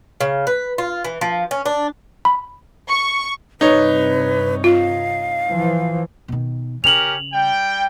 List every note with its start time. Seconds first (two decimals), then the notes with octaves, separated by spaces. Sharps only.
0.21 C#3
0.47 B4
0.78 F4
1.05 E3
1.21 F3
1.51 C#4
1.66 D4
2.25 B5
2.89 C#6
3.61 G2 C3 D#4 B4 C#5
4.64 F4 F5
5.47 E3 F3
6.28 B2 D#3
6.84 C#3 C#4 G4 A#4 F7 F#7
7.33 G3 G5